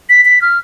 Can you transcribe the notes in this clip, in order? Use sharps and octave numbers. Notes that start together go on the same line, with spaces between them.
B6
B6
F6